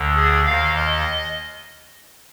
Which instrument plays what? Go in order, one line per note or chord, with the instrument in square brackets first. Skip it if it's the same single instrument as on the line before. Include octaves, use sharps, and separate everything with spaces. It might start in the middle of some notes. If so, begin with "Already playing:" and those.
Already playing: [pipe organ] D2 D3
G#4
D#2 D#3 F5
D#5